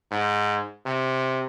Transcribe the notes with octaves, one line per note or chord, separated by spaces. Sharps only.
G#2
C3